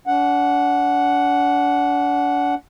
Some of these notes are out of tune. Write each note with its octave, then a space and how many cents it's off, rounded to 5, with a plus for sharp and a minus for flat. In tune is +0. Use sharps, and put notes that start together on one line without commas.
D4 -40 F#5 +0